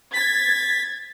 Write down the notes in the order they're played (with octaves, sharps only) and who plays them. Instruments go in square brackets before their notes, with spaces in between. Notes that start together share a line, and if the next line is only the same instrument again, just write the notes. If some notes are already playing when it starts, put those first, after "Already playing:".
[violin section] G#6 A6 [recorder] B6